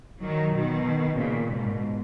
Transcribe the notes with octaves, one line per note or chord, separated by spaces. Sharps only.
D#3 F#3
B2 D#3
A#2 C#3
G#2 B2